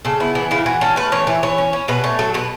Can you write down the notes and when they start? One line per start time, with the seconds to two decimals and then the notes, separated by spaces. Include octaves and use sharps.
0.05 C#3 A4
0.20 B3 E4
0.35 E3 E4
0.51 C#3 E4
0.66 E3 F#4
0.81 C#4 A4
0.96 A3 B4
1.12 E3 C#5
1.27 E3 E5
1.43 E3 C#5
1.58 C#4
1.73 C#4
1.88 B2 B4
2.04 A3 C#5
2.19 F#3 A4
2.34 B2 B4